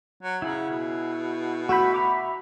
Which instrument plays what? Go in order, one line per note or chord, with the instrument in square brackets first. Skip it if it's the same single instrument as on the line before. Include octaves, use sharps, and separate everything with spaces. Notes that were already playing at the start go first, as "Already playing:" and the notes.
[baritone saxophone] F#3
[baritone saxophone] C#3 [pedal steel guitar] E4 G#4 F#5
[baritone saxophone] B2
[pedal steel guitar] A3 E4 G6 [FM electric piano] F#4 B5
[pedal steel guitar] E5 A#5 D6